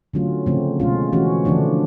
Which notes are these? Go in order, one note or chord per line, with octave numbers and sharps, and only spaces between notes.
D3 F#3 A3 C#4 F4
C#3 F3 A3 C4
B2 G#3 C#4 F4
E3 A3 C#4 F#4
D3 F3 A3 D4